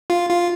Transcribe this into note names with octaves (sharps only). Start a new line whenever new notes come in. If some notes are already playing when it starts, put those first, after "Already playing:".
F4
F4